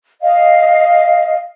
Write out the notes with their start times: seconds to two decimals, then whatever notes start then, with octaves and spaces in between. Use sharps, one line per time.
0.21 D#5 F5